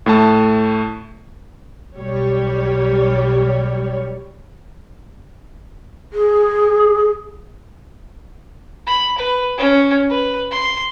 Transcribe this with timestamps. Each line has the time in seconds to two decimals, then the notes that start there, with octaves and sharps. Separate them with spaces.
0.06 A2 A3 A5
1.97 B1 G3 C#5
6.13 G#4
8.87 B5
9.18 B4
9.57 C#4
10.10 B4
10.51 C6